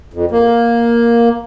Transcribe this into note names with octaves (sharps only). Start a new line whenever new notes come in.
F2
A#3